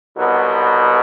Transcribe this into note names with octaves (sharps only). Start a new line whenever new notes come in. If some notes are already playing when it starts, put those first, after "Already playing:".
C2 B2 F#3 B3